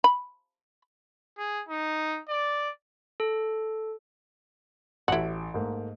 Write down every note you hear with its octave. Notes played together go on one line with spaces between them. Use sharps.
B5
G#4
D#4
D5
A4
A1 E4 F#4 A4 D7
G#2 A3 A#3